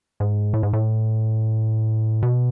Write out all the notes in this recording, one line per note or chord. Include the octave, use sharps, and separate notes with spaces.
G#2
A2
G#2
A2
B2